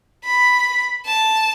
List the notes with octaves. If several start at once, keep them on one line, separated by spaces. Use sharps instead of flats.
B5
A5